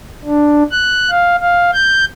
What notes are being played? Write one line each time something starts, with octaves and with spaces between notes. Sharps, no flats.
D4
F#6
F5
F5
G6